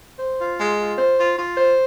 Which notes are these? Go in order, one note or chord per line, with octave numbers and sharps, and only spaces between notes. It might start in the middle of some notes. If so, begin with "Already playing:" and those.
C5
F4
G#3
F4
C5
F4
F4
C5